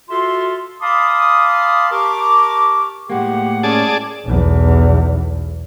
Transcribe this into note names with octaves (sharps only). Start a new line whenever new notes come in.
F4 F#4 A4 E5 C6
F5 A5 B5 C6 D6 D#6
G4 A#4 A5 A#5 C#6 D6
A2 G#3 A#3 G4 F#5
C#4 G#4 D5 A5
B1 E2